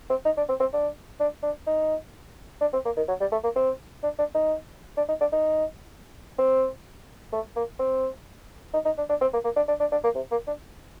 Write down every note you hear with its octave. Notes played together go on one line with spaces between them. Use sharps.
C4
D#4
D4
C4
C4
D4
D4
D4
D#4
D4
C4
A#3
D#3
F#3
G3
A3
A#3
C4
D4
D4
D#4
D4
D#4
D4
D#4
C4
A3
A#3
C4
D#4
D#4
D4
D4
C4
A#3
A#3
D4
D4
D4
D4
A#3
C3
A#3
D4